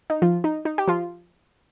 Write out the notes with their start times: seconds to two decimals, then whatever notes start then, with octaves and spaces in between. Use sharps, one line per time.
0.10 D#4
0.22 F3 F4
0.44 D#4
0.65 D#4
0.78 G4
0.88 F3 F4